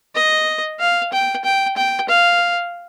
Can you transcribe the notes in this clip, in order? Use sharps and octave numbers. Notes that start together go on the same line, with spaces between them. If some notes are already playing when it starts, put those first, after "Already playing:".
D#5
F5
G5
G5
G5
F5